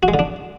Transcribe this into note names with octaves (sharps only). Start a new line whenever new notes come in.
F#4
G#3
D3
D4